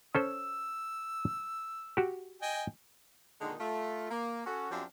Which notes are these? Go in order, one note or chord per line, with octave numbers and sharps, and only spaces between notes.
C#4 A4 C5 E6
F#4 G4
D#5 G5 G#5
A#2 D3 D#3 G#3 D#4
A3 F4
A#3
C#4 F#4 A4
F#2 F3 C4 D4 G4 F5